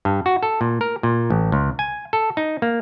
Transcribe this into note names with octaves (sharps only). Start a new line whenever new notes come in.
G2
F#4
A4
A#2
A#4
A#2
A1
C#2
G#5
A4
D#4
A#3